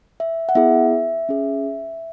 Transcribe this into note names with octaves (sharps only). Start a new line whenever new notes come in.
E5
F#5
B3 E4 G#4 E5
C#4 G#4